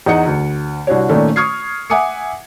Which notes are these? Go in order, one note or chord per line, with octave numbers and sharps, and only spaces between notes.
E2 D#4 D#5 F#5 C#7
D2
C2 D4 F#4 C#5
A#2 D#3 A3 C#4 D4
C#6 D#6 F6 G#6 C7
E5 F#5 G#5 D6 D#6 C#7